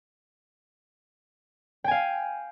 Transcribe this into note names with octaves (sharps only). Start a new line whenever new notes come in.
F5 G5 G#5